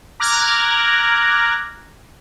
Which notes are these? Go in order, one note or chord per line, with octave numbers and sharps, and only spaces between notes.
A#5 D6 F6 F#6 G#6 A#6